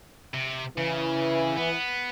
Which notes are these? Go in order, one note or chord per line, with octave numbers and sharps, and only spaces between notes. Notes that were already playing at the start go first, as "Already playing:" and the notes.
C3
C#3 E3
B3